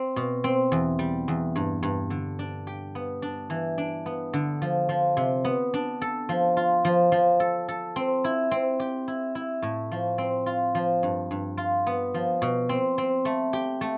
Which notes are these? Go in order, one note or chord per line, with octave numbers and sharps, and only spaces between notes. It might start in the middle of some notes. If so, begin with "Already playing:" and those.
Already playing: C4
B2
C4
E2
G3
E2
G2
G2
D3
D4
G4
B3
D4
E3
D4
B3
D3
F3
F3
C3
B3
D4
A4
F3
F4
F3
F3
A4
A4
C4
E4
C4
G4
E4
E4
A2
F3
C4
F4
F3
G2
G2
F4
B3
F3
B2
C4
C4
A3
G4
A3